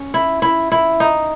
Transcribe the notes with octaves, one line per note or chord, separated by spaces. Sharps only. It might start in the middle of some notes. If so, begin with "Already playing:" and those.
Already playing: C#4
E4
E4
E4
D#4